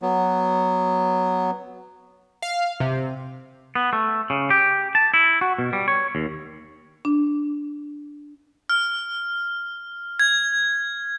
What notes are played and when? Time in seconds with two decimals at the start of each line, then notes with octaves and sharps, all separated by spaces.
0.02 F#3 B3
2.42 F5
2.80 C3
3.75 B3
3.93 A3
4.30 C#3
4.50 G4
4.95 A5
5.14 E4
5.41 F#4
5.59 B2
5.73 G3
5.88 C#5
6.15 D#2
7.05 D4
8.70 F6
10.19 G#6